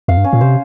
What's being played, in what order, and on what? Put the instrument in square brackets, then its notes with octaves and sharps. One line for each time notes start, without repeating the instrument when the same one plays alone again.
[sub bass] F2 [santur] F5
[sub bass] G2
[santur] C#4
[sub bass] A#2
[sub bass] C3 [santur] C5